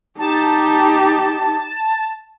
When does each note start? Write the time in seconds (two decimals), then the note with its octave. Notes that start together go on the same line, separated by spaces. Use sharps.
0.19 D#4 G4 A5